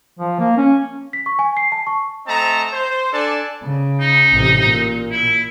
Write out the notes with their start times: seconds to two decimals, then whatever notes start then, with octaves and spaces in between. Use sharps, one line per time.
0.19 F3
0.39 A#3
0.57 C#4
1.13 B6
1.26 C#6
1.39 G#5
1.57 C7
1.72 A5
1.87 C#6
2.27 A3 C4 D#5 A5 A#5
2.71 C5
3.13 D4 A4 D5 G#5 A5
3.63 C#3
4.00 D#4
4.32 A1 C3
4.62 A#2
5.11 E4